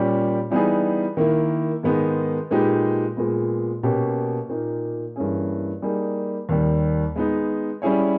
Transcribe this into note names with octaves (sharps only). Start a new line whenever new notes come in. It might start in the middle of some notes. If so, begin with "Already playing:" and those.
Already playing: A#2 G3 C#4 G4
E3 G3 B3 D#4 G#4
D#3 A#3 E4
G#2 D#3 G#3 B3 D#4
A#2 G#3 D#4 G4 B4
A#2 G#3 B3
B2 A#3 C#4 G4
A#2 A#3 D#4
G2 E3 A#3 C#4 G#4
G3 A#3 D#4 G#4
D#2 D#3 G3
G#3 B3 D#4
G3 C#4 E4 G#4 C#5